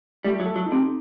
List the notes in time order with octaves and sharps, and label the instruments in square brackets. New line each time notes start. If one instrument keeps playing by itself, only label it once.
[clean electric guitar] G3 [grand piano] A3
[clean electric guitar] F#3
[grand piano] A4
[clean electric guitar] F#3
[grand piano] D#4
[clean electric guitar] C3